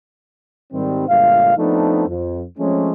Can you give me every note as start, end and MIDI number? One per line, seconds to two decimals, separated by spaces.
0.73 1.07 44
0.73 1.07 51
0.73 1.07 55
0.73 1.07 60
1.08 1.54 31
1.08 1.54 46
1.08 1.54 56
1.08 1.54 76
1.08 1.54 77
1.58 2.07 53
1.58 2.07 57
1.58 2.07 59
1.58 2.07 60
1.58 2.07 62
1.58 2.07 63
2.08 2.42 41
2.58 2.92 53
2.58 2.92 56
2.58 2.92 57
2.58 2.92 60
2.58 2.92 61